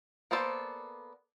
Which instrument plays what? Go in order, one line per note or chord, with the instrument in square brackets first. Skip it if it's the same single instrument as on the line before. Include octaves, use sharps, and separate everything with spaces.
[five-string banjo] A#3 B3 A4 C5 D5